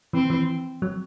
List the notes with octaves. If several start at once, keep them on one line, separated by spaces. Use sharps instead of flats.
E3 C4
E3
F#3